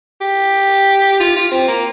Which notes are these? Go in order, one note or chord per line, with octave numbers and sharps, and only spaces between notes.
G4
F4
F4
C4
A#3